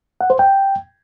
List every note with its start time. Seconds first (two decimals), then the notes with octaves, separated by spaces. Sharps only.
0.21 F#5
0.30 C5
0.39 G5